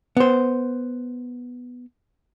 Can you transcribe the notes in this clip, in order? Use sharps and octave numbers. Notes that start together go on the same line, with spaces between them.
B3 C5